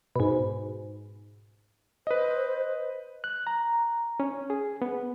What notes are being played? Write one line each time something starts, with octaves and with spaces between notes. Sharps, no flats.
G#2 B2
B4 C5 D#5
F#6
A#5
C#4
G#4
B3